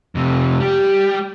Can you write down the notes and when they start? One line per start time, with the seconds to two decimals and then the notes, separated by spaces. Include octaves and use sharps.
0.15 F2 C3
0.60 G3 G4